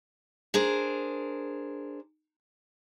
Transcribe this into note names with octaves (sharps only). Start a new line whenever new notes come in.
D4 G#4 A#4 C5